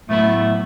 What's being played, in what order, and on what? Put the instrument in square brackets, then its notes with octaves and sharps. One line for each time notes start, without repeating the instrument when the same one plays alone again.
[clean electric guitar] A2 F#3 B3 E4 [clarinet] A3